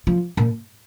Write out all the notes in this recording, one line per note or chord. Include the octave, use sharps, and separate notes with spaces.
F3
A#2